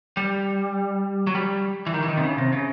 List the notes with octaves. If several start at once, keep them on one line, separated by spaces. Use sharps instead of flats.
G3
F#3
G3
E3
D#3
E3
D#3
C3
C#3
C3
C#3